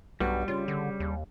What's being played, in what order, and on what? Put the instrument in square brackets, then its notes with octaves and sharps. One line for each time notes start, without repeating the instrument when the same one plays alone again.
[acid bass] B1 [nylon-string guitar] G2 B3 F#4 [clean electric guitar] G3
[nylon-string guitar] C#3 [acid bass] F4
[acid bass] D3
D#2